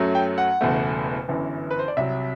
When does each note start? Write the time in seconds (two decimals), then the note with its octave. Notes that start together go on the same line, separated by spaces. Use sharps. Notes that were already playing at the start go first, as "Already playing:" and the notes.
Already playing: F#2 F#3 A3
0.15 G5
0.38 F#5
0.61 F#1 E2 B2 A3
1.28 G1 F#2 E3
1.71 B4
1.79 C5
1.88 D5
1.97 C2 C3 F#3 E5